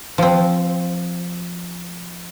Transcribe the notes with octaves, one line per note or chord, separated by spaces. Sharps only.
F3 C4